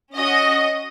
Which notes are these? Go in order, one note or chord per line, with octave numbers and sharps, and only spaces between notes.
C#4 F#4 D#5